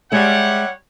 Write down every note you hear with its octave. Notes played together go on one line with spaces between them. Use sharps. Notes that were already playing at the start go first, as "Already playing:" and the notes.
G3 G#3 C#5 E5 F#5